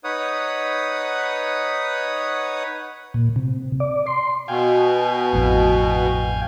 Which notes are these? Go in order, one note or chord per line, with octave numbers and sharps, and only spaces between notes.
D#4 B4 C#5 F#5 D#6
A#2
C3
D5
C6
B2 F5 G5 G#5
A1 F2 A2